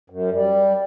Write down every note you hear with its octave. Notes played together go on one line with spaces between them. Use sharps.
F#2
G3